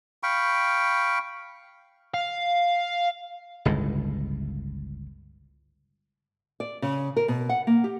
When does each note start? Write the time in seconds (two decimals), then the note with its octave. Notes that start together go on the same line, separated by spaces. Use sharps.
0.23 F5 G5 B5 C#6
2.14 F5
3.65 G1 C#2 A2
6.60 D5
6.82 C#3
7.17 A#4
7.28 B2
7.49 F#5
7.67 A#3
7.84 G4